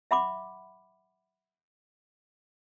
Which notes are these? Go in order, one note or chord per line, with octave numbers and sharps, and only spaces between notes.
E5 F#5 B5 C6 D6